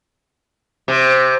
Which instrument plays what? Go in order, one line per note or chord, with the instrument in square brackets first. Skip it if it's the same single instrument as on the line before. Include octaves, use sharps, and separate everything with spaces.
[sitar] C3